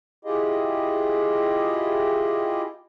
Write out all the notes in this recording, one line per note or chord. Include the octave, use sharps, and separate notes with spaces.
E4 F4 G4 G#4 D#5